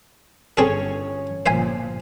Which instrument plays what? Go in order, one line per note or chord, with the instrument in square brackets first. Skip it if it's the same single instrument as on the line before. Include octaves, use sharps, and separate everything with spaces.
[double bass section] G1 [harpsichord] C4 G#4 A4 [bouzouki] C#4 C#5
[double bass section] G1 A#2 F3 [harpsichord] C5 E5 G#5